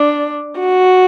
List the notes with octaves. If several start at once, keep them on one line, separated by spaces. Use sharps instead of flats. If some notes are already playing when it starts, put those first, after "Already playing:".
Already playing: D4
F#4